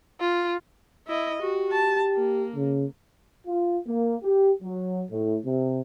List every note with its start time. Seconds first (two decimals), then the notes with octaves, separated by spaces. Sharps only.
0.20 F4
1.07 E4 D#5
1.42 F#4 G4
1.73 A5
2.15 A#3
2.55 C#3
3.46 F4
3.87 A#3
4.23 G4
4.61 F#3
5.10 A2
5.44 C3